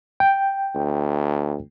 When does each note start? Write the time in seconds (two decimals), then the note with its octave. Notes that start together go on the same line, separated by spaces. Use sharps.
0.20 G5
0.75 D2